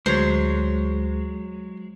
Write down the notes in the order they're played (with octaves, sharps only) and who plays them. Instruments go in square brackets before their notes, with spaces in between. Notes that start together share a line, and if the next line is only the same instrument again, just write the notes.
[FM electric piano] D2 [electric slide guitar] F#3 G#3 [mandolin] C5 C#5